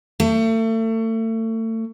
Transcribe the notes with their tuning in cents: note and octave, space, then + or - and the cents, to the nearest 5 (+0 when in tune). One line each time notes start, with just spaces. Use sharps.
A3 +35